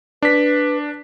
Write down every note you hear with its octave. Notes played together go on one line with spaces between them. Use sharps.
D4 B4 B6